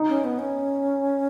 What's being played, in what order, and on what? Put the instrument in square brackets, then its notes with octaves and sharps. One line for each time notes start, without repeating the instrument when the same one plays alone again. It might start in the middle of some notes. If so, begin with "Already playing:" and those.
Already playing: [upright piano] D#4
[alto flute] C#4
B3
C#4